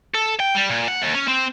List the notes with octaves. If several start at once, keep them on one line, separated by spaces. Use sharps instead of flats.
A4
G5
G3
A#2
F#5
D#2
C#4
C4